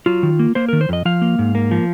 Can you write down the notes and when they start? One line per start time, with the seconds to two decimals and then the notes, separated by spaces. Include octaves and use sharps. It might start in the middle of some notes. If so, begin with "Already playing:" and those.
0.06 F#3 F4
0.23 D#3
0.39 A#3
0.55 A#3 C5
0.69 D#3 A#4
0.81 C5
0.89 F2 D#5
1.05 F3 F5
1.22 A#3
1.39 G#2
1.55 A#3
1.71 F3